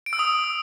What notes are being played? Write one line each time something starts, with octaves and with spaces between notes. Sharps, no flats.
D7
E6
D#6